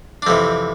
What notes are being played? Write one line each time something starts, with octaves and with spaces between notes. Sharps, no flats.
D4
F2 C3 E3 C4